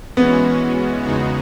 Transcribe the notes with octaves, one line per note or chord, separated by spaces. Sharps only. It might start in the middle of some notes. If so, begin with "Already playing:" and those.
E3 G#3 B3 C#4 F#4
E2 C#3 G#3 D#4 F#4